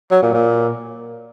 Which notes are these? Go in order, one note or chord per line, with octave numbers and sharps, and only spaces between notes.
F#3
A#2
A#2